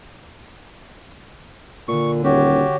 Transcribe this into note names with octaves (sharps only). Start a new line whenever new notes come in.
A#2 D3 C#6
D#1 F#4 G4 C#5